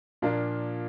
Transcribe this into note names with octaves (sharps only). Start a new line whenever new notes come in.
A#2 F3 A#3 D4 F4